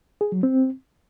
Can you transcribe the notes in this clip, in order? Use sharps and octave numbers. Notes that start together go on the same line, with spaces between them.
G#4
F#3
C4